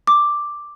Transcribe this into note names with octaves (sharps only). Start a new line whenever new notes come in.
D6